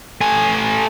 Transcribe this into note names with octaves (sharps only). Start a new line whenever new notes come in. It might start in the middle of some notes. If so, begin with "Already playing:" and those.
A3 G#5